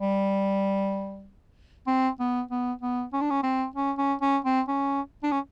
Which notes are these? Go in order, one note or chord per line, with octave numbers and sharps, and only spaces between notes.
G3
C4
B3
B3
B3
C#4
D4
C#4
C4
C#4
C#4
C#4
C4
C#4
D4
C#4